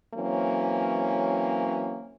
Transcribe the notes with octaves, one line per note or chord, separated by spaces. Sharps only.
E3 F#3 A#3 C4 C#4